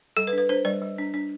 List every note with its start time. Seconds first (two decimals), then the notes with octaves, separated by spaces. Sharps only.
0.17 G3 A4
0.27 B4
0.33 D4
0.38 B4
0.49 D4 C5
0.65 G3 D5
0.82 G3
0.98 D4
1.14 D4